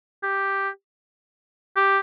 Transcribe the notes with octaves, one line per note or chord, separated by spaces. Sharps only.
G4
G4